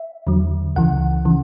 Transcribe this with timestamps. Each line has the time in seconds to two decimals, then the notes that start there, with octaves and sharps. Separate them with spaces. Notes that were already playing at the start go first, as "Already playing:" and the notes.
Already playing: E5
0.27 E2 D3 F#3
0.76 C#2 C#3 E3 F#5
1.25 C#3 E3